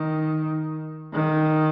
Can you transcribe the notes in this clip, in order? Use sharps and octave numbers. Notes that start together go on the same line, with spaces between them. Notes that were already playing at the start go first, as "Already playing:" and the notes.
Already playing: D#3
D#3